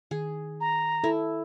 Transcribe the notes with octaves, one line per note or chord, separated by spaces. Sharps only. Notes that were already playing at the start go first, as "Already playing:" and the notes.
D#3 G#4
A#5
E4 A4